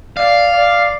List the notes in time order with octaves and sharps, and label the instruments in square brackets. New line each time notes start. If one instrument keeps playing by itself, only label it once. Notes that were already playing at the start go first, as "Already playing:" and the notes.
[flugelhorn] D5 [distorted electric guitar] F5
[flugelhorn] D5